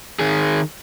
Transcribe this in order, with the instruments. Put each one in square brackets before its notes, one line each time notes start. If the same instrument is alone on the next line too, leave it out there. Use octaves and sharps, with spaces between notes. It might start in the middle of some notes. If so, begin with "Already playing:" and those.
[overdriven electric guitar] D#3 G#4